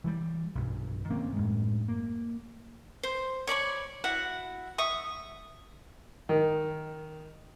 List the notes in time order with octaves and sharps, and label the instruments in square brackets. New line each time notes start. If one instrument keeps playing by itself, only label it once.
[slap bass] E3 F3 G3
B1 G2
D#3 A#3 C4 C#4
F#2 A2 G#3
A#3
[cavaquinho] C5
C#5 D5 B5 C#6
E4 F#4 F#5
E5 C#6 D#6
[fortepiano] D#3